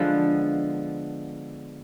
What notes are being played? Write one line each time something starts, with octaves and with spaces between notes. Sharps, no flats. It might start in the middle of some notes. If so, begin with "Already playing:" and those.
Already playing: D3 F3 G#3 B3